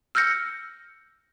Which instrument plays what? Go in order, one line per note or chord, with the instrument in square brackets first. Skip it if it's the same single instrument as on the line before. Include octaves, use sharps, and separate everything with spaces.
[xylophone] E6 F6 G6 A#6 C#7